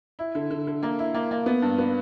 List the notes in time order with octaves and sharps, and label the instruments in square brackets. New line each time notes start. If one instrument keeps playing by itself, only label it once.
[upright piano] E4
D3
D3
D3
A#3
E4
A#3
A#3
B3
G2
B3